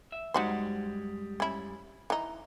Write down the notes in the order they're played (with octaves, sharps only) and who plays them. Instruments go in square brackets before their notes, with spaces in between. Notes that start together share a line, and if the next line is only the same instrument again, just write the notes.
[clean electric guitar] E5
[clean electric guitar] F#2 G3 G#3 [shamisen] D#4 F#4 C5
[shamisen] C#4 E4
E3 D#4